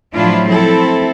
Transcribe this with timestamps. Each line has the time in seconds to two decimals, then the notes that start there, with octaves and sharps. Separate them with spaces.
0.16 A2 F3 F#3 D4 E4 F4
0.49 C4 E4 A4